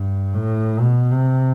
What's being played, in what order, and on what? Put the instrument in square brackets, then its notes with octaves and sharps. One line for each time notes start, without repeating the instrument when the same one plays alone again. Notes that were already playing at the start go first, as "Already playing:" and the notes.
Already playing: [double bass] G2
A2
B2
C3